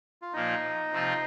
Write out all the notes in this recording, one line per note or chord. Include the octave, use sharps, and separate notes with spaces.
F4
A#2 F3 A#3 D#4
C3 F3 C4 F4